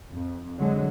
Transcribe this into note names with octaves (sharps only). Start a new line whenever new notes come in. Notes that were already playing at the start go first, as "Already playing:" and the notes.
F2
D3 F#3 G#3